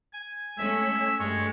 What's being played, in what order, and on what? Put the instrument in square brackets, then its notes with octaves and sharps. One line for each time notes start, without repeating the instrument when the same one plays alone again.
[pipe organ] G#5
[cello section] G#3 A3 C#4 [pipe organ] E5
[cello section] G2 A3 [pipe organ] G#3 C#5